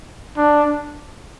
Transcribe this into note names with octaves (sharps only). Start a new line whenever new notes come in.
D4